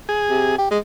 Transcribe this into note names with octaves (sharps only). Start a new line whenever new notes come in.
G#4
C3
G4
G#3